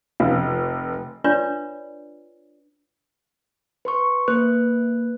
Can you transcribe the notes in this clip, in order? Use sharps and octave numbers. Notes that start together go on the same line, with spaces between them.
F1
D4 F4 B4 C#5 D5
B4 C6 C#6
A#3 B4 F#6